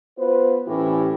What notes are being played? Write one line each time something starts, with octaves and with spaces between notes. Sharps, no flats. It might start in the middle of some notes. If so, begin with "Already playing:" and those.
B3 F4 B4 C5
A2 E3 C#4 E4 G4